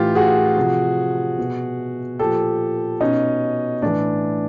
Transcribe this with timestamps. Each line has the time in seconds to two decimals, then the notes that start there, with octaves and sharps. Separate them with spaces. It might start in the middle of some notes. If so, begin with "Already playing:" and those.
Already playing: A2 E3 F4 G4
0.15 F#4 G#4
0.57 C3 F3
1.39 B2
2.19 A#2 F3 G4 A4
3.01 B2 C#4 D#4
3.82 A2 E3 D4